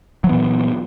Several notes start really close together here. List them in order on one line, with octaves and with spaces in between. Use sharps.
F#3 E3 B3 A#2